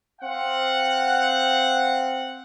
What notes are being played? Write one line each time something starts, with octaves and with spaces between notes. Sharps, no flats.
C4 F5 F#5